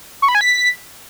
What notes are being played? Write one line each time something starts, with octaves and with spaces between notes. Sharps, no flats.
C#6
B5
G#5
B6